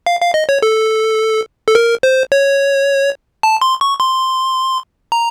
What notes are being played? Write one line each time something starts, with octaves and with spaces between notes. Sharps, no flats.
F5
F5
D#5
C#5
A4
A4
A#4
C5
C#5
A5
C6
C#6
C6
A#5